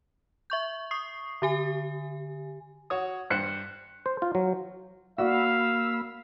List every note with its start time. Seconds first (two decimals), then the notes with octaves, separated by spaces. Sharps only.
0.50 E5 C#6 G6
0.91 C#6 D#6 C7
1.42 D3 G4 G#5
2.90 F#4 C#5 D#6
3.30 G2 C5 F#6 C#7
4.06 C5
4.22 F4
4.35 F#3
5.18 A#3 F#4 D5 F5 B5 E6